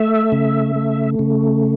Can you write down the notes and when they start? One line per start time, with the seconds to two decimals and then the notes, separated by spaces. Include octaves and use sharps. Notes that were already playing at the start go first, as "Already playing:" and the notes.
Already playing: A3 E5
0.32 C#3
0.76 A3
1.19 C#3